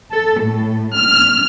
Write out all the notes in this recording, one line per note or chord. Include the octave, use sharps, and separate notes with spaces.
A4
A2
F6